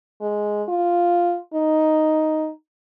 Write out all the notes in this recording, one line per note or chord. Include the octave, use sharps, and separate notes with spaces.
G#3
F4
D#4